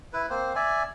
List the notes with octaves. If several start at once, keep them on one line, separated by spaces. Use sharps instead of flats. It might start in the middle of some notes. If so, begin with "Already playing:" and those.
E4 B4
A#3 C4 C5
D5 E5 G#5